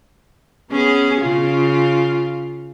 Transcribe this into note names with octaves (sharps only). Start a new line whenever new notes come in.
B3 C#4 G#4
C#3 F4